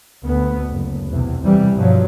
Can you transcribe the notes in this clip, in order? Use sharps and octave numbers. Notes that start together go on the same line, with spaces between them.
D2 B3
F#1
B1 E2 C3
C3 E3 G3
G2 B2 F3 F#3